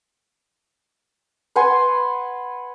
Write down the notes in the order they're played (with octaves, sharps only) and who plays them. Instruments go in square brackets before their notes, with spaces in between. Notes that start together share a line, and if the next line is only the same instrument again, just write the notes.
[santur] B4 F#5 G#5 C6